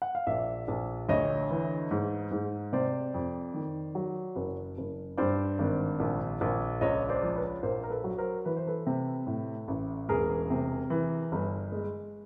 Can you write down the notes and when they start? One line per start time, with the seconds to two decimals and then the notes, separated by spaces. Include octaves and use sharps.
0.02 F#5
0.15 F5
0.27 A#1 D5 E5
0.68 A#1
1.09 D2 C#5 D#5
1.50 E3
1.91 G#2
2.31 G#2
2.73 C3 C5 D5
3.14 F2
3.54 D#3
3.95 F#3
4.36 F#1
4.78 F#1
5.17 G2 C5 D5
5.59 G#1
6.00 A#1
6.41 A#1
6.81 C#2 C#5 D#5
7.09 C5 D5
7.23 F3
7.36 B4 C#5
7.63 A#1 A#4 C5
7.83 A#4
7.90 A4 B4
8.04 F#3
8.18 A#4 C5
8.45 E3 B4
8.56 C5
8.67 A4 B4
8.86 C3
9.27 A2
9.68 A1
10.09 E1 G#4 A#4
10.50 C3
10.90 E3
11.32 G1
11.72 G#3